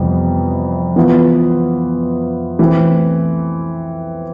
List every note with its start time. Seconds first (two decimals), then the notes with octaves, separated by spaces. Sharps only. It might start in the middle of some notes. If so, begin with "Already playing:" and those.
Already playing: F2 C3 E3 G3 B3
0.96 E3 B3 F4
2.59 E3 A3 C4